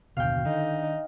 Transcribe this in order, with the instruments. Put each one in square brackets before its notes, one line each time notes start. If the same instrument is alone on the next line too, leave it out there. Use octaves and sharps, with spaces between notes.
[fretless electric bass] F#1 D#2 D3 [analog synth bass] B2 [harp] F5 G5
[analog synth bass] D3 [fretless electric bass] D#3 [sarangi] D#4